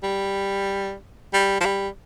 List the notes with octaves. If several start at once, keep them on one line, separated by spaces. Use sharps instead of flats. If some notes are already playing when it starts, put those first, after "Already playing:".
G3
G3
F3
G3